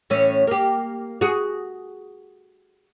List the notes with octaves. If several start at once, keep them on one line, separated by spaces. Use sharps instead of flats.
A2 E3 C#4
A#3 G4
F#4 G#4